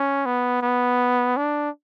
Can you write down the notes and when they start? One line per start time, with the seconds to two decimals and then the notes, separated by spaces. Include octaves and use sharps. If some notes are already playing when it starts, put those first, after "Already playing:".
Already playing: C#4
0.26 B3
0.62 B3
1.37 D4